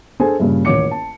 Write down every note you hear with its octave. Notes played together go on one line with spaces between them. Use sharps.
D4 G#4 A4 C5 G#5
G2 A#2 C#3
D#1 A1 C#5 D6 C#7
A5